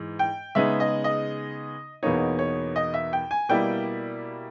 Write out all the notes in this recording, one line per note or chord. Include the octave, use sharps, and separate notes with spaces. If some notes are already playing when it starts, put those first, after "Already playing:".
Already playing: G#2 E3
G5
C#3 G#3 B3 D#4 E5
D#5
D#5
E2 B2 A#3 D#4 C#5
C#5
D#5
E5
G5
G#5
B2 G3 A#3 E4 G5